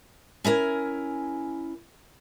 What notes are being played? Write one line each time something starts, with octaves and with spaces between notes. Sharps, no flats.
C#4 E4 A#4 G#5